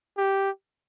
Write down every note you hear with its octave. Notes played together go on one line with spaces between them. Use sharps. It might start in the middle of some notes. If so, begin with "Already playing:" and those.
G4